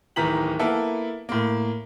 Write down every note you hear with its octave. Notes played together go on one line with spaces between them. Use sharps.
D1 D#3 E3 A#5 B6 F#7
A#3 B3 E4 A4
A2 A#3